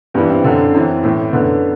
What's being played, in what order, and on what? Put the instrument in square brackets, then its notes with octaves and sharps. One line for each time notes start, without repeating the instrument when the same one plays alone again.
[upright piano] G2 E3 B3
C4
F#2 D3
F#2 E3 C4
A2 E3
F#2 D3 B3